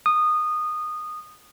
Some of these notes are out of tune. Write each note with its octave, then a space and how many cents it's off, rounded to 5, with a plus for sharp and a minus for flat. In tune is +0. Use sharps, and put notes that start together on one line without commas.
D#6 -20